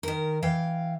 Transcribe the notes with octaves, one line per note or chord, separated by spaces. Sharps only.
D#3 A#4
E3 F5 G5